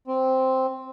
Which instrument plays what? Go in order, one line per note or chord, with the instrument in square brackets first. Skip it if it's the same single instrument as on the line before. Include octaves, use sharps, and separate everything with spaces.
[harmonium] C4